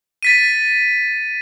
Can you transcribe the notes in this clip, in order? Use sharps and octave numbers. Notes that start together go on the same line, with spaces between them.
A6 B6 D#7